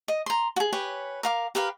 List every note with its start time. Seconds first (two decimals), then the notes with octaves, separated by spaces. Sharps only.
0.08 D#5
0.26 A#5 C6
0.56 F#4 G#4
0.73 G4 B4 C#5 G#5
1.23 A#4 F5 D6
1.55 G4 A#4 B4 F5